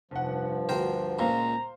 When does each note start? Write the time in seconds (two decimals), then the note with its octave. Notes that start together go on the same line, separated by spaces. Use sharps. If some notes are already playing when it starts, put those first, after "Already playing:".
0.11 F1 G2 F3 F#5
0.69 D2 F#4 A#4 C5 G5
1.19 C#2 A#2 C5 F5 A#5